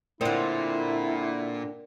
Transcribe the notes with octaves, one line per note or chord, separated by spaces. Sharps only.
A#2 D3 C4 E4 A#4 D5 G5